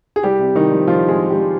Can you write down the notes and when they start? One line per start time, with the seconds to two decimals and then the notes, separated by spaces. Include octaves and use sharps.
0.16 G#4
0.23 C2 G3 G4
0.39 C3
0.55 C2 D#3 D#4
0.71 F3
0.87 C2 F3 F4
1.03 C3
1.09 G#3 G#4
1.20 C2
1.30 G3 G4
1.36 F3